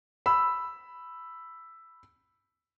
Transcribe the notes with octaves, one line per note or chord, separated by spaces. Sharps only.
B5 E6